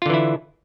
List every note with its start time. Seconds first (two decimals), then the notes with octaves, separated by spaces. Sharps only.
0.02 F4
0.06 D3
0.10 E3
0.14 E4